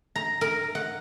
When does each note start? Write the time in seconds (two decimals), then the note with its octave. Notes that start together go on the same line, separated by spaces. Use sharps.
0.16 A#5
0.41 A#4
0.75 F#5